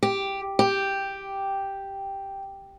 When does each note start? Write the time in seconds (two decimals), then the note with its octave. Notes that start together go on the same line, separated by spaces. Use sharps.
0.03 G4
0.59 G4